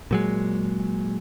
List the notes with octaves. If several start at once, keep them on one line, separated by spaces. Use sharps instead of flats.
A#2 F#3 G#3